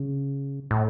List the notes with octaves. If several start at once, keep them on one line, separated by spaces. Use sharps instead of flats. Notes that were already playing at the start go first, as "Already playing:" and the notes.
Already playing: C#3
A2